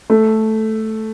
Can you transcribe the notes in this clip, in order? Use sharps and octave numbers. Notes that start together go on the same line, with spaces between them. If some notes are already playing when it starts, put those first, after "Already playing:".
A3